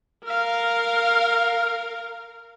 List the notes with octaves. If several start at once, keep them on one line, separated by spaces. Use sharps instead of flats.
A#4 F5